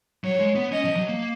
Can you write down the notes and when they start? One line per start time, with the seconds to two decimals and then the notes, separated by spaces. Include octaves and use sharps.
0.24 F#3 C#5
0.40 G#3
0.55 B3
0.72 C#4 D#5
0.85 F3
0.96 F#3
1.08 A#3